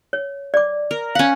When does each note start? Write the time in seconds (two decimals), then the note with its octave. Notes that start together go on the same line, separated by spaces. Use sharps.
0.13 C#5
0.54 D5 D6
0.91 A#4
1.15 C#4 F5 F#5